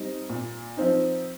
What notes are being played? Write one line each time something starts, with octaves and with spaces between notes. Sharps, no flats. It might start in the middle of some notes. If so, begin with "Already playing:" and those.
Already playing: G3 C4 D#4
A#2
F3 C4 D#4